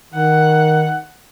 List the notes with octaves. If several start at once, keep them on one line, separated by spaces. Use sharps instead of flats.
D#3 F#5